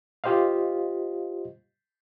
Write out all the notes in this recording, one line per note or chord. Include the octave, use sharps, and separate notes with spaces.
F4 G4 C5 D#5 F5